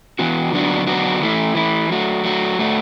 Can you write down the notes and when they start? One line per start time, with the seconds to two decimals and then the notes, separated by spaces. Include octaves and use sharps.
0.19 E3 B3 F#4
0.53 D3 F#3 B3 D4 F#4
0.87 D3 F#3 B3 D4 F#4
1.22 E3 A3 E4
1.55 E3 A3 E4
1.89 F#3 A3 F#4
2.24 F#3 A3 F#4
2.58 A2 A3 F#4